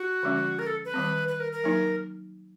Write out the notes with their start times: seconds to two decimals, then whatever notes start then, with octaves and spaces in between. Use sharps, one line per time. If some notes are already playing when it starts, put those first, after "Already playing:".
Already playing: F#4
0.23 D3 F3 G#3 C#4
0.59 A#4
0.67 A4
0.85 B4
0.94 D#3 G3 C4
1.28 B4
1.40 A#4
1.53 A#4
1.64 F#3 A#3 D#4